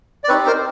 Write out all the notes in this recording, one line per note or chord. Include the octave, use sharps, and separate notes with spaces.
D5
C4 D#4 G4 B4 C#5
A#4 C5